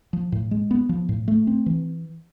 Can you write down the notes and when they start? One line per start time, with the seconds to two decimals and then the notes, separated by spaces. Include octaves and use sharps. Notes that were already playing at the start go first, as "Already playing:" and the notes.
0.13 F3
0.32 A2
0.51 G#3
0.71 B3
0.89 F3
1.09 A2
1.28 A3
1.47 C4
1.66 E3